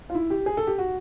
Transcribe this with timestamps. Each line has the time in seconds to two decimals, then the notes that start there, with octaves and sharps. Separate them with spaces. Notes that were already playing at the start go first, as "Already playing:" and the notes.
0.10 F4
0.15 E4
0.30 G4
0.46 G#4
0.57 A4
0.67 G4
0.78 F#4